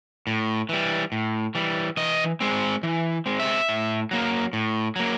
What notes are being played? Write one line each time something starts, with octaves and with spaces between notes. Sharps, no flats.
A2
E3 G3
A2
E3 G3
E3 D#5
G#3 C4
E3
G#3 C4
E5
A2
F#3 A#3
A2
F#3 A#3